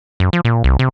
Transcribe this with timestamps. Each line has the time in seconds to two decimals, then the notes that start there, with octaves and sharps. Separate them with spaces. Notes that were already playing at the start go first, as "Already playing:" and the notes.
0.20 F#2
0.33 F3
0.45 A#2
0.64 C2
0.79 C3